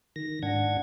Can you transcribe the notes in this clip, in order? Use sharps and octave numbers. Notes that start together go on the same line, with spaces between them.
D#3 A#6
G#2 D4 F#5 G#6